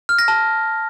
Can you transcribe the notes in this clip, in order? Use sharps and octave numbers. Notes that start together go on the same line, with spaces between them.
F6
A#6
A5